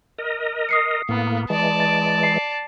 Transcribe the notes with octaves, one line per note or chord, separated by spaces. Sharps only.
A#4 D#5
D#6 C7 C#7
A2 A#3 B3
E3 G#3 D5 A5
A6 D7
C7